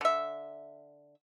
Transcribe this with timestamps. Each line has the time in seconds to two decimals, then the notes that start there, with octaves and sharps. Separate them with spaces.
0.01 D3 E5